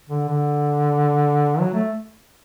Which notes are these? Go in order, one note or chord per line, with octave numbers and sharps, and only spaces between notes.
D3
D3
F#3
A3